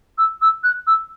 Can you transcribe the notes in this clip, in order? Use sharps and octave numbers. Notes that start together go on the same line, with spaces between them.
E6
E6
F#6
E6